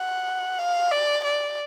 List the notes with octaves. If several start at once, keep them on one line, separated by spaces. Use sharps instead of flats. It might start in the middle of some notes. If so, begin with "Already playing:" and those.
Already playing: F#5
F5
D5
D5